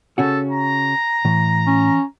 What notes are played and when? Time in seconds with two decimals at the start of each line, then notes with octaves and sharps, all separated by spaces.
0.18 C#3 C#4 F#4 A4
0.51 A#5
1.25 A2 E3
1.67 C#4